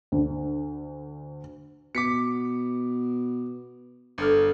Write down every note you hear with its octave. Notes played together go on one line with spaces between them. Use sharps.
D2
B2 D6 B6 C#7
G1 D4 A4 F6